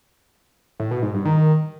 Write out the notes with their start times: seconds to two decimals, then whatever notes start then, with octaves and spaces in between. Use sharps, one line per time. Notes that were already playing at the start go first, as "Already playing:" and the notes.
0.79 A2
0.91 B2
1.02 G#2
1.14 G2
1.25 D#3